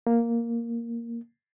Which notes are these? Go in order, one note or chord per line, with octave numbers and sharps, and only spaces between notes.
A#3